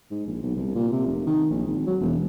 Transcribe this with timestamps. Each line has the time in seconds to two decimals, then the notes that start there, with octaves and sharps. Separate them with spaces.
0.11 G#2
0.27 A#1
0.43 B1
0.57 C2
0.75 A#2
0.92 C3
1.06 F1
1.26 D#3
1.50 A#1
1.67 G#1
1.87 F#3
2.01 E1